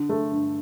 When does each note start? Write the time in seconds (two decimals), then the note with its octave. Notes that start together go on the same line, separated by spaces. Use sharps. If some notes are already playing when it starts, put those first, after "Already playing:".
Already playing: D3
0.09 A3
0.32 G2